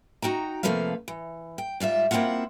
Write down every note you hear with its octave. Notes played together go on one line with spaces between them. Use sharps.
D#4 F#4 G5 A#5
C3 F3 A3 A#3 B4 F5
E3
G5
G#2 G3 F4 E5
A#3 C4 C#4 E4 F4 F#5